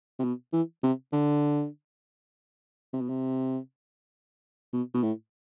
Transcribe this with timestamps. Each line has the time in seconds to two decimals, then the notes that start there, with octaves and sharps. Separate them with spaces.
0.19 C3
0.24 B2
0.53 E3
0.83 C3
1.13 D3
2.94 C3
3.01 B2
3.09 C3
4.73 B2
4.95 B2
5.03 A2